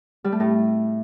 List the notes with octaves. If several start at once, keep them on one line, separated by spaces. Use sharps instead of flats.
G3
A3
A2